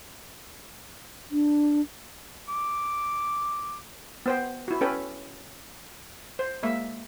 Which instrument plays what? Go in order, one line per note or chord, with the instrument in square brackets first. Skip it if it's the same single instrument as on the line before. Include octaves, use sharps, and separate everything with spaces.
[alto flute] D4
[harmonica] D6
[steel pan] B3 C5 G5
E4 F#4
C#4 A4 B4 G5
C5
G#3 A#3 E5